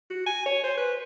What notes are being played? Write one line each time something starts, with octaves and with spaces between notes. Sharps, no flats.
F#4
G#5
C#5
C5
B4